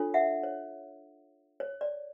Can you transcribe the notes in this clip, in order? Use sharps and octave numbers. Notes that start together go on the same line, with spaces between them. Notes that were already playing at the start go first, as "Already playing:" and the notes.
Already playing: D4 F4 A4 C#5
E5 F#5
C#5
C#5
D5